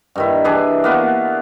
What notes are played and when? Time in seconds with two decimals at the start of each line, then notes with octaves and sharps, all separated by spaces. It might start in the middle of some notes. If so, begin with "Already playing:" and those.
0.16 G2 D#3 E4
0.45 E3 D4 G#4 B4
0.84 A#3 B3 F#4